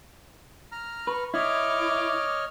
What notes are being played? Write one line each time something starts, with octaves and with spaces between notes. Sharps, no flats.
A#5 F6
B4 C#6
E4 C#5 D#5 D6 F6